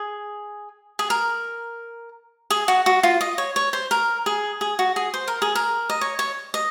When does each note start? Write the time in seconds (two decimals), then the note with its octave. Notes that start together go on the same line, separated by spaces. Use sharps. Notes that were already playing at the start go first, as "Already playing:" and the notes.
Already playing: G#4
0.99 G#4
1.10 A#4
2.50 G#4
2.68 F#4
2.86 F#4
3.03 F4
3.21 D#5
3.38 C#5
3.56 C#5
3.73 C5
3.91 A#4
4.26 G#4
4.61 G#4
4.79 F#4
4.96 G#4
5.14 C5
5.28 A#4
5.42 G#4
5.55 A#4
5.90 D#5
6.01 C#5
6.19 C#5
6.54 D#5